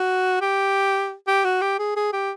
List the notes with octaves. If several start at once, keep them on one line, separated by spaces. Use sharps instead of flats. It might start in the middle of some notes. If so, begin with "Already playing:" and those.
Already playing: F#4
G4
G4
F#4
G4
G#4
G#4
G4